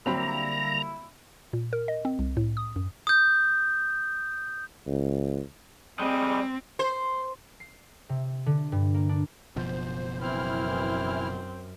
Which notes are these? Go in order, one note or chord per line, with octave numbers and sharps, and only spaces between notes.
D3 F#3 G3 A#3 C4 E4 A#5 B5
A#2
A#4
D#5
C4
C2
A2
D#6
F#2
D#6 G6
C#2
G3 G#3 C4
C5
C7
C3
D3
G2
A#3
D4
F#1 B2 F3 C5
F#2 E3 C4 E4 F6